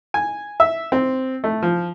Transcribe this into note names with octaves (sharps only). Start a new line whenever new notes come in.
G#5
E5
C4
A3
F3